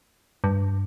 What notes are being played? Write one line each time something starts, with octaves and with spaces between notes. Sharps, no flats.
G2